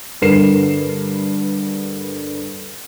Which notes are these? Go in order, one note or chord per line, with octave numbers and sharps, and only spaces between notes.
G2 D3 A#4 B4 C7 E7